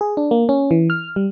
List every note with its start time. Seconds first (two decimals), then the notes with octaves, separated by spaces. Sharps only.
0.01 G#4
0.17 D4
0.31 A#3
0.49 C#4
0.71 E3
0.90 F6
1.16 G3